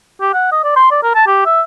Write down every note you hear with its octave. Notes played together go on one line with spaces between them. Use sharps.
G4
F#5
D#5
D5
C6
D5
A#4
A5
G4
E5